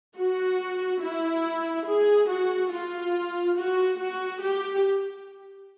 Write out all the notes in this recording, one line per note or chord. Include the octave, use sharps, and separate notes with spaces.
F#4
E4
G#4
F#4
F4
F#4
F#4
G4